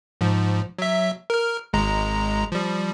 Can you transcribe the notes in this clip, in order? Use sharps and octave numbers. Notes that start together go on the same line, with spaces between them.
G#2 F3
F#3 E5
A#4 F6
G#1 G#3 A#5
F3 G3